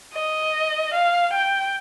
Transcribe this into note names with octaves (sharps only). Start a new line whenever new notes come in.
D#5
F5
G5